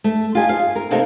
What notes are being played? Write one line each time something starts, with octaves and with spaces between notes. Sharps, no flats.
A3
F4 G4 D#5 G#5
F5
A#4
C3 A3 A#3 D#4 A4